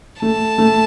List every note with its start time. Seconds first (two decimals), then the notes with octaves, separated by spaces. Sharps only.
0.21 A3 A5
0.58 A3